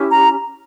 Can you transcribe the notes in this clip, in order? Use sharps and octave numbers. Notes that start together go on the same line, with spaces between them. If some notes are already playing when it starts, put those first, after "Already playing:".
Already playing: C#4 E4 G4
A#5